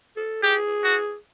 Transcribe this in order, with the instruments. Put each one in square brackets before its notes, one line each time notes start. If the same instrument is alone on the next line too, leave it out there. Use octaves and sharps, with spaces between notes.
[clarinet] A4
[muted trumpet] G4 [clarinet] G#4
[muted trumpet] F#4